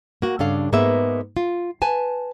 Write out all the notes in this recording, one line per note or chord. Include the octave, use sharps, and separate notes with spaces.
A#3 F#4
G2 C#3 D4 A4 F5
G#2 A#3 B3 G#4 B4 E5
F4
B4 G#5 A5